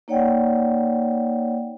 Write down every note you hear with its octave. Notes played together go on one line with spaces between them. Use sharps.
A#3 D#4 C#5 D5 F#5 G5